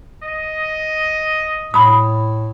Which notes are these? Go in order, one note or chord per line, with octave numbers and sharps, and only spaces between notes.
D#5
A2 B5 D#6